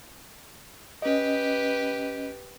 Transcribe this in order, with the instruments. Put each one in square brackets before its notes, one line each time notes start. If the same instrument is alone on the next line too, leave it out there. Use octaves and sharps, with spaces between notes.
[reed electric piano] C#4 D#5 [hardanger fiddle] G4 B4